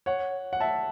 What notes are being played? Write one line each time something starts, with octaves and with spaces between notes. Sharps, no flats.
C#5 F#5
F#5
E5 A5